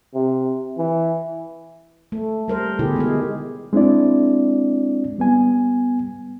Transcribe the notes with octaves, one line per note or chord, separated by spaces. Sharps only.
C3
E3
A3
G3 A#4 C5
B2 D3 E4 G4 G#4
D#3 G#3 G#4
G#3 C4 D4 E4 D5
G3 B3 G#5